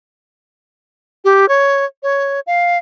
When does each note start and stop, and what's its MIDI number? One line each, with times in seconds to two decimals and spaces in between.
1.25 1.48 67
1.48 1.85 73
2.03 2.40 73
2.47 2.78 77